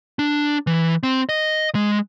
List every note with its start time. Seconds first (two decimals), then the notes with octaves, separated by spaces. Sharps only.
0.19 D4
0.67 E3
1.03 C4
1.29 D#5
1.75 G#3